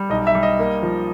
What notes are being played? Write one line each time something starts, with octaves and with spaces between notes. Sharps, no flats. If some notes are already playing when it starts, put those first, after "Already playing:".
Already playing: G3
B1 D#5
E5
G3
D#5
A#3
F3